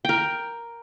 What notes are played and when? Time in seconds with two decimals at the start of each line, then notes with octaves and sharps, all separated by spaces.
0.05 A#4 G5